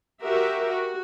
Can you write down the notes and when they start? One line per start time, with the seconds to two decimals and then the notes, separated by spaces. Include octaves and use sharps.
0.22 F#4 G4 A#4 E5
0.67 F#4